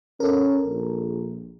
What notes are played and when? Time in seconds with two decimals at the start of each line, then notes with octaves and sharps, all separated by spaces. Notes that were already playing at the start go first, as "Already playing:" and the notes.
0.20 C#4 A4 A#4
0.66 A#1